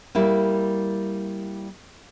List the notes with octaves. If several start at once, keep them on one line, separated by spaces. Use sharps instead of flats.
G3 A#3 E4